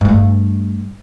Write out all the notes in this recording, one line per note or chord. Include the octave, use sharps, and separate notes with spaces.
G2 A3